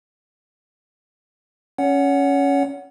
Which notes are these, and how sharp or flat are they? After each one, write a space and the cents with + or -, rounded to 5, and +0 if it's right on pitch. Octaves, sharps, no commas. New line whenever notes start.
C#4 +0 C#5 +35 F#5 +0